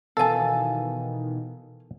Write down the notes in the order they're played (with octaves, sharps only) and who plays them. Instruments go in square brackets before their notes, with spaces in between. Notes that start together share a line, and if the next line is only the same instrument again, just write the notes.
[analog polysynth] B2 D#3 E3 [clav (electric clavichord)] A4 A5 [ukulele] F5 G#5